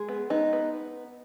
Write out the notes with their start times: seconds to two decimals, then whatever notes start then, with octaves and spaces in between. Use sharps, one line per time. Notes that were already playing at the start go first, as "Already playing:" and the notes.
Already playing: G#3 G#4
0.09 B3
0.30 B3 D#4
0.53 B3